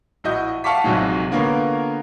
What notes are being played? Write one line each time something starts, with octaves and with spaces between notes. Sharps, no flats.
A#1 E4 F#4 D#5 G6
F5 F#5 A5 C#6 D6 B6
A#1 G#2 C3 F#3 G#3
D3 A#3 B3 F4 A#4 C#5